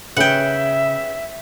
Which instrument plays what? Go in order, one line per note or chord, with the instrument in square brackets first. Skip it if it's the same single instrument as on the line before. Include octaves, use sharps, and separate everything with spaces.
[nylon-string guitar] C#3 [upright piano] C#4 G#4 B4 [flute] E5 [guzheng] F#5 G5